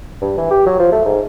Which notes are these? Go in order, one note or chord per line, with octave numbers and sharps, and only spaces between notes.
G2
E3
G4
F#3
F3
A3
G#2